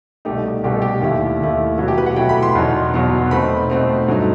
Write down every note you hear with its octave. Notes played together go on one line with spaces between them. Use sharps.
C2 B2 A3 D#4 G4
C2 B2 A3 D#4 G4
A4
G4
D#2 D#3 A3 E4 G4
D#2 D#3 A3 E4
B2 F#3 A3 E4 F#4
G4
B4
F#5
B2 F#3 A3 E4 G5
B5
C6
E2 B2 F#3 B3 D#4
E2 B2 F#3 B3 D#4
B2 A3 C4 D#4 B5
B2 A3 C4 D#4
G2 F#3 A3 D#4